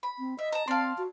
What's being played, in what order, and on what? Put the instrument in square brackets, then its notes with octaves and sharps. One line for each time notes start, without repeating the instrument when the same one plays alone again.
[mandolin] B5
[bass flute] C4
[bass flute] D#5 [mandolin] E5
[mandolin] A5 A#5
[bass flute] C4 [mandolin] D5 F5 [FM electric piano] A5 C6
[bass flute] F#4